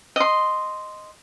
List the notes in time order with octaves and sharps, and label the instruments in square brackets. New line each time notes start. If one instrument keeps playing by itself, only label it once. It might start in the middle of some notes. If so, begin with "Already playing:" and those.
[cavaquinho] D#5 C6